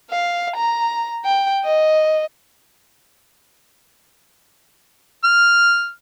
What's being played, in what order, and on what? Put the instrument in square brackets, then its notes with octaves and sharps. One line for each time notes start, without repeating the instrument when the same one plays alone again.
[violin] F5
A#5
G5
D#5
[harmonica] F6